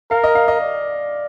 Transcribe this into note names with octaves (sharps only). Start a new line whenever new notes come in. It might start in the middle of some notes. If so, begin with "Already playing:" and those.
A#4 F5
D#5
F5
D#5
D5